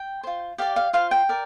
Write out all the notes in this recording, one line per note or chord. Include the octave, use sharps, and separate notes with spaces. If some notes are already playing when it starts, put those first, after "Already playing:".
Already playing: G5
F4 C5
G4 D5 F5
F5
F4 C5 F5
G5
A#4 D5